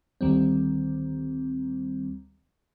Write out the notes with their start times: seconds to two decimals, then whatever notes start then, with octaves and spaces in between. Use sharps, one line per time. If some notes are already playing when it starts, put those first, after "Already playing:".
0.21 D2 D#3 G3 C4